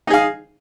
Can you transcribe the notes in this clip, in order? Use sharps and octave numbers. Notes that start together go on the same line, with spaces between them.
D#4 G#4 F5